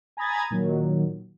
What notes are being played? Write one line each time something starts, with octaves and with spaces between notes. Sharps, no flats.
G#5 A#5 B5 D#6 G#6 A6
A#2 D#3 F#3